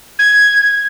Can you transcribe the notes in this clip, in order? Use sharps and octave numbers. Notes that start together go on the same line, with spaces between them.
G#6